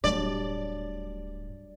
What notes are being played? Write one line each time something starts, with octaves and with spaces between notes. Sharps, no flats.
D1 A2 F#3 G3 D4 D5